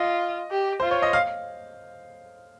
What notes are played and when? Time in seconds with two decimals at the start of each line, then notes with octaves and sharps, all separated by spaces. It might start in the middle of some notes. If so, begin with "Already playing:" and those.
Already playing: F4 D#5
0.51 G4
0.80 F4 C5
0.91 C#5
1.02 D#5
1.13 F5